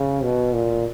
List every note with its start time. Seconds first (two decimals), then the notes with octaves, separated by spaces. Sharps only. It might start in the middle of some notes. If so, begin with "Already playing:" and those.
Already playing: C#3
0.23 B2
0.53 A#2